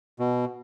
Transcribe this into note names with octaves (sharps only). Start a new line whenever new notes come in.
B2